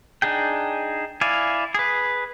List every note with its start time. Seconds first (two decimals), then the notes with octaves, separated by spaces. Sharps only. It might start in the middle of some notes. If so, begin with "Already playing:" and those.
0.22 D4 D#4 G#4 G5
1.21 E4 D5 F5 G#5
1.75 G#4 B4